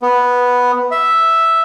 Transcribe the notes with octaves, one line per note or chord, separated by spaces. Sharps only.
B3
E5